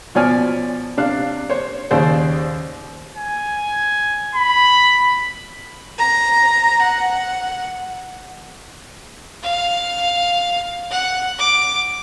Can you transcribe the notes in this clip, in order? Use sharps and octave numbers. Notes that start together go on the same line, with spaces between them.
B2 F3 C#5 D5 G#5 F6
C3 D4 F5 F#6
C5 C#5
D#2 C#3 C5 D5
G#5
B5
A#5
F#5
F5
F#5
D6